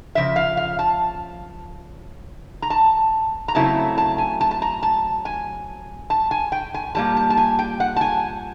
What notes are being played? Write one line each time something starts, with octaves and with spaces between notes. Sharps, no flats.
C#3 F3 E5
F5
F5
A5
A#5
A5
A#5
C#3 F#3 A3 C4 E4 A5
A5
G#5
A5
A5
A#5
A5
G#5
A5
G#5
G5
G#5
A#2 G3 A#3 A5
A5
A5
G#5
G5
F#5
A5
G#5